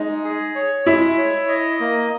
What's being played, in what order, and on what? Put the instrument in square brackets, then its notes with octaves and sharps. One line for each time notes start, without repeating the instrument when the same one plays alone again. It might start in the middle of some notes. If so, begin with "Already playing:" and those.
Already playing: [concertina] G#3 [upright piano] D#4
[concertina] G#4
C#5
[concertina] G#3 [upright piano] E4
[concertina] C#5
D#5
A#3